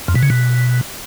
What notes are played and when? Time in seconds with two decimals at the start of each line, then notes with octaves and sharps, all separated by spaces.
0.08 F2
0.15 B2
0.23 C#3
0.30 B2